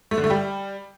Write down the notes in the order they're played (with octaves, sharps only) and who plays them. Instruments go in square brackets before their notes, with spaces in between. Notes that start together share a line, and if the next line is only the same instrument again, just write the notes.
[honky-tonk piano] A3
D3
A3
G3